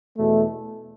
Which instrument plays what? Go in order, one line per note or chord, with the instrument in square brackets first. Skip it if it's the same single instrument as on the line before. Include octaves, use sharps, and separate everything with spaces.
[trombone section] E2 B2 A3